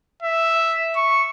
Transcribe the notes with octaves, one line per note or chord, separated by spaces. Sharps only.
E5
C#6